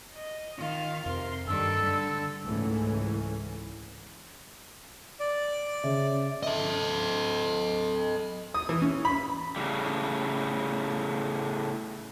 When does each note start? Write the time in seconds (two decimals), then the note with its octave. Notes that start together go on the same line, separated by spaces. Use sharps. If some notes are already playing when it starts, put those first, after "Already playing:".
0.14 D#5
0.57 D#3 F4 F5
1.06 F2 C3 A#4 C6
1.47 G2 D#3 G3 A4 E6
1.83 D3 G3
2.46 C#2 G#2 E3 A3 C#4
5.20 D5
5.84 C#3 E5
6.43 A4 D#5
8.54 D#6
8.69 E3
8.82 C#4
9.05 B5
9.56 A2 C#3 G3